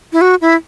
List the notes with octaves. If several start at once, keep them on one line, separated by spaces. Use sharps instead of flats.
E4
F#4
E4